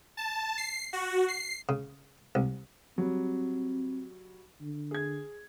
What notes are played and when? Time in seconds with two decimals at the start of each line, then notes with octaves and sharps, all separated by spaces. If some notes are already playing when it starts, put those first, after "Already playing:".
0.17 A5
0.58 C7
0.93 F#4
1.28 C7
1.69 C#3
2.35 C2
2.98 F#3 G3 C4
4.61 D3
4.91 G#4 G#6